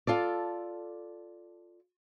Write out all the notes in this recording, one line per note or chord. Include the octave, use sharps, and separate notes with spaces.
F4 A4 D5